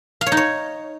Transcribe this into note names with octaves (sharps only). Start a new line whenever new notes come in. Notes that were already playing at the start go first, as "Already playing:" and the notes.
F5
C#5
D#4
C#5